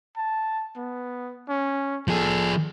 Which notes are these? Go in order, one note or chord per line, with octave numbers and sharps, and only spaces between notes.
A5
B3
C#4
F3 G#4 A4